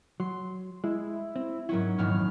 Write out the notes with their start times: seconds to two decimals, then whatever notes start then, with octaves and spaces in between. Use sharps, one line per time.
0.20 F#3 C6
0.84 G#3 E4
1.36 C4
1.69 G#2 F#3 C#4 E4 A#4
1.98 D#1 F2 G#2 B3 F6